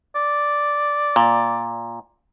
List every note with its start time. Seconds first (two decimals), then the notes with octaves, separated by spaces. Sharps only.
0.15 D5
1.16 A#2